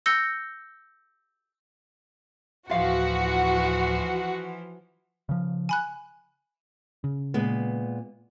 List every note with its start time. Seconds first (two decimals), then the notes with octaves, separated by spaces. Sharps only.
0.06 E6 G6 A#6 C#7 G7
2.69 D2 A2 E3 F3 F4 F#4 F5
5.29 C#3 F3
5.69 G#5 B5 F#6
7.04 C#3
7.34 A#2 G#3 B3